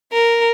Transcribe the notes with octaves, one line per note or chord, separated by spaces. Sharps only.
A#4